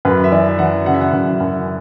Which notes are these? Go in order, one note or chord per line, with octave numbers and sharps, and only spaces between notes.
F#2 B4
E5
E3 D5
E5
E3 F#5
C#3 F#5
E5
F#5
F#2
F#2